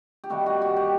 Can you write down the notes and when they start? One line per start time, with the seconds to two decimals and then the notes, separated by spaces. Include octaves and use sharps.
0.24 G4
0.30 C3 D#3 G3 A#3 F#4
0.46 F#4
0.62 F#4
0.77 G4